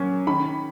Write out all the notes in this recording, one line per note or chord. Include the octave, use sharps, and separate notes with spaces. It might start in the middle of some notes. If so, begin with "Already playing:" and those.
Already playing: F#3 A#3 C#4
D#3 B5